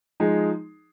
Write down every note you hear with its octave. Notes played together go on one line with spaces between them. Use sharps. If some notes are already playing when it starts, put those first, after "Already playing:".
F3 G#3 D#4 G#4